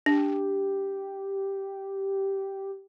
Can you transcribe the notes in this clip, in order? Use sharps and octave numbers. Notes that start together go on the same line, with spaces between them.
D4 G4